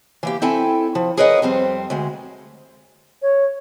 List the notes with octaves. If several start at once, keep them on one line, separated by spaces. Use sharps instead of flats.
E3 A#3 G4
C4 E4 A4 G5 G#5
F3
G#4 A#4 B4 C#5 D#5 F#5
F2 G3 C4
D2 G#3
C#5